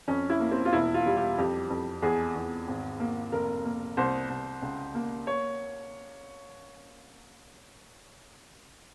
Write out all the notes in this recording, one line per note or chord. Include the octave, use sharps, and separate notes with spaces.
F2 C#4
E4
A#3
C4
F4
E1 E4
F4
G3
G4
F2 G4
F2
E2 G#4
E2
G#1
A#3
F1 A#4
A#3
C2 C5
C2
C#2
A#3
C#5